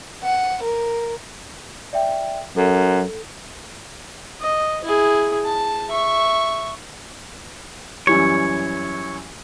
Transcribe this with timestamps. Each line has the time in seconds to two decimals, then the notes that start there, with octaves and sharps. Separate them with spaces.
0.23 F#5
0.62 A#4
1.93 D5 E5 G5
2.56 F#2 A4
4.41 D#5
4.84 E4 G#4
5.45 A5
5.89 E5 C#6
8.07 F#2 E3 G3 C#5